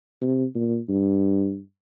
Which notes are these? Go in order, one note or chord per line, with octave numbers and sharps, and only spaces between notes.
C3
A#2
G2